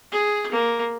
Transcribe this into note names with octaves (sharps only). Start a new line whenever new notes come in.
G#4
A#3